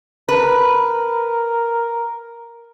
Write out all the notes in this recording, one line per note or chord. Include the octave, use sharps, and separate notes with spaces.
A#4 B4